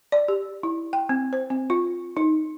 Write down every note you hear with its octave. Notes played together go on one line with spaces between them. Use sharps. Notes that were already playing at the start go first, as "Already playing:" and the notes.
D5
G4
E4
G5
C4
C5
C4
F4
D#4